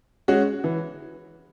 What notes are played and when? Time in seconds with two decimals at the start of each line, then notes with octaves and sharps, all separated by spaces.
0.28 G#3 C#4 F#4
0.64 E3